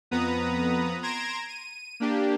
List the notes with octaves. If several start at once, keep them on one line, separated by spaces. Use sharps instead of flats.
F2 B3 B4 A#5 D#6
A#5 C6 G#6 A#6 D7 E7
D#7
A#3 D4 G4